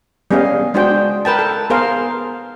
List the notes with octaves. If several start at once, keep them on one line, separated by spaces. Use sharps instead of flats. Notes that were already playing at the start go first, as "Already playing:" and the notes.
G3 B3 C#4 G#4 D#5 F5
G#3 D4 F#4 G#4 C5 G5
A#4 B4 G5 A5
A4
B3 G#4 A#4 C5 F5